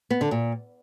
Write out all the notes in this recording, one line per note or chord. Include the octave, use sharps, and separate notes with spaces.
B3
D3
A#2